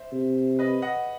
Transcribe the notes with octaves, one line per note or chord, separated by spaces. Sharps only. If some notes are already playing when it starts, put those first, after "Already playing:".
Already playing: C5 E5
C3
B4 D#5
D#5 F#5